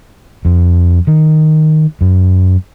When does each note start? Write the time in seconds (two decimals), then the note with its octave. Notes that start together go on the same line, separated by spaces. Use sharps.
0.45 F2
1.07 D#3
2.01 F#2